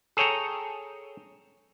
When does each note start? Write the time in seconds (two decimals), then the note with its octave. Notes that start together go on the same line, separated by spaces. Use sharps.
0.17 G#4 A4 C#5 G5 A#5